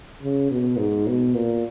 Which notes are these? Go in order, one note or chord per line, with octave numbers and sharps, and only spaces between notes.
C#3
B2
G#2
B2
A#2